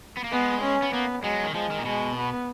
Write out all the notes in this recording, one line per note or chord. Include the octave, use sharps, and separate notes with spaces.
B3
A#3
G#3 B3
C#4
B3
A#3 B3
F#3 G#3
D#3
F3 G#3
D#3
A#2
B2 G#3
B3